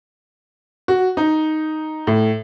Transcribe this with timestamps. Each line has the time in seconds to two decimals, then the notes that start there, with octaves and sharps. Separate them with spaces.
0.88 F#4
1.17 D#4
2.07 A2